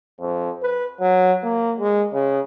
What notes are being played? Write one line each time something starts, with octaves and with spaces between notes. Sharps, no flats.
F2
B4
F#3
A#3
G#3
C#3